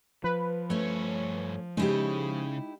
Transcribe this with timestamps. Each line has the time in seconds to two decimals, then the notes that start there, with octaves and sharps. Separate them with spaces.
0.24 F3 B4
0.70 G2 A3 C#4 C#5
1.77 C#3 G#3 D#4 E4 G4